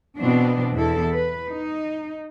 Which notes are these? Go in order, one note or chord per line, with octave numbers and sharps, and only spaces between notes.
B2 E3 B3 C4 D4
E2 E4 A4
B4
D#4